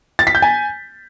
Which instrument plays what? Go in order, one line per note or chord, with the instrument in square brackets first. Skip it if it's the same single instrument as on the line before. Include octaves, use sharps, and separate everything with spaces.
[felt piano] A6
B6
G6
G#5